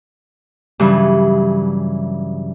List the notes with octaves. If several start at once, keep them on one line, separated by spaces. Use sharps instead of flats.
G2 C#3 E3 F#3